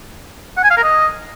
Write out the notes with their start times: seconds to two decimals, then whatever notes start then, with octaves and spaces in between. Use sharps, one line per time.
0.57 F#5
0.64 G#5
0.70 F5
0.77 A#4
0.84 D#5